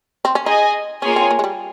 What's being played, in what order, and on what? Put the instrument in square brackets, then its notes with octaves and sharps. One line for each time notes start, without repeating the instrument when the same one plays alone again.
[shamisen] C4
C#4
[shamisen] D#4 [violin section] G#4 D#5 G#5
[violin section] A#3 F4 G#4 C#5 G#5 [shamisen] C#4
[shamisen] C4
A#3
G#3
G3